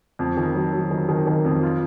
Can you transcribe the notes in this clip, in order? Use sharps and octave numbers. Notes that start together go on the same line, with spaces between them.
F2
D#3
F#3
F#3
D#3
D#3
D#3
F2
F4